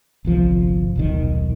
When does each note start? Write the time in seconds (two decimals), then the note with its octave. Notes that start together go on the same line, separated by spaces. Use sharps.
0.25 G1 C2 F3
0.96 D#1 B1 D#3